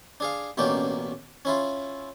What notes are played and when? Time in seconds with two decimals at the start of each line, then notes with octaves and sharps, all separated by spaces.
0.20 D4 G#4 F5
0.57 A1 B2 A#3 C#4 D4 G5
1.45 C#4 E4 F4